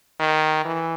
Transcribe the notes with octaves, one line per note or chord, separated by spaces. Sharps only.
D#3
E3